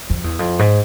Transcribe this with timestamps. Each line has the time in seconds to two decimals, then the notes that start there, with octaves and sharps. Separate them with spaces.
0.10 F2
0.24 E2
0.39 F2
0.59 G#2